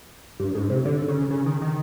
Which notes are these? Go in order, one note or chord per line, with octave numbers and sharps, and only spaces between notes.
G2
G#2
C3
D3
C#3
C#3
D#3
D#3